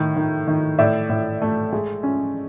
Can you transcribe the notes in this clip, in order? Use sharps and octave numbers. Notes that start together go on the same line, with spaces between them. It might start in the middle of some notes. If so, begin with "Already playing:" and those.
Already playing: A2 D#3
D#3
D#3
A2 D5 E5
A2
A3
G#3
C#4